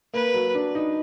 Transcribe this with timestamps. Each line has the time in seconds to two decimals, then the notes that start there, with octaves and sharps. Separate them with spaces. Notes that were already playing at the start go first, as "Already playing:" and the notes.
0.14 A#3 B4
0.34 F#3
0.55 D4
0.75 D#4